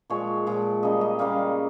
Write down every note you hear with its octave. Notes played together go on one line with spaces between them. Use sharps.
A#2 F3 G#3 C#5
A#2 F3 G#3
C#3 G3 A#3 D#5
D#5
C#3 G3 A#3 F5